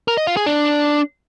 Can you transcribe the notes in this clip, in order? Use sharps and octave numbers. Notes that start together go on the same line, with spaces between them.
A#4
D#5
F4
G#4
D4